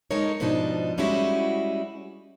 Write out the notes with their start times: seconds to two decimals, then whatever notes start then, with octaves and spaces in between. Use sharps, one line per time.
0.11 G#3 A#3 D#4 A4 A#4 C#5
0.40 G#2 B2 F3 D4 D#4
0.98 G3 G#3 C#4 D#4 E4 F#4